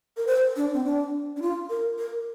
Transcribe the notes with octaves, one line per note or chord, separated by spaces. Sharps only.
A#4
C5
D4
C4
D4
D4
F4
A#4
A#4